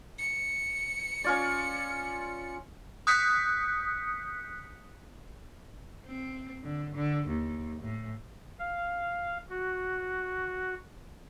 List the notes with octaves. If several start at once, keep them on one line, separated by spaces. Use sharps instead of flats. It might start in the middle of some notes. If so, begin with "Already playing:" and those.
C#7
C#4 F4 D5
D#6 F#6 G6 B6 C#7
C4
D3
D3
D#2
A2
F5
F#4